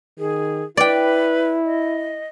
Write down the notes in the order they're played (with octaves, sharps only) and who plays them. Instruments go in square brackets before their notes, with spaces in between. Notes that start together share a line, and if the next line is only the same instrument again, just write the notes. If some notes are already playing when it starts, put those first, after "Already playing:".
[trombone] D#3 [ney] G#4
[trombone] E4 [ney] B4 [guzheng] D5 G5
[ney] D#5